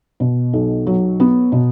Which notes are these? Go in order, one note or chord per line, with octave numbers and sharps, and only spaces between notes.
B2
B1
F#3
B3
B2